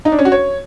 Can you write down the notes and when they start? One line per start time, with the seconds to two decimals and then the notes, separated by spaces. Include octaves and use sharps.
0.05 D#4
0.12 D4
0.19 C#4
0.25 F#4
0.32 C#5